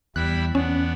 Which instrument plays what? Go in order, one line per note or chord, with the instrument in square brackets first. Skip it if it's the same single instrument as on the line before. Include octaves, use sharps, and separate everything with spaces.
[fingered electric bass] E2 [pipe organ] G3 E4 B5 [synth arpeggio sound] F#6
[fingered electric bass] E2 [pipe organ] B3 D4 [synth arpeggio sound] C#4